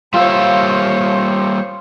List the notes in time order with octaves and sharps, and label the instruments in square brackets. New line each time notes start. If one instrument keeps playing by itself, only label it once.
[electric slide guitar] G3 A#3 E5 [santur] F4 [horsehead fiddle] C5 C#5